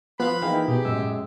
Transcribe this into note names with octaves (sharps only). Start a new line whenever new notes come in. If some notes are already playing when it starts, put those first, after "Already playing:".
F3 B3 F4 B4 F5 B5 F#6
E3 A#3 D#4 G#4 E5 F5 G5
B2 B3 G4 G#4
F#2 A2 G#3 E6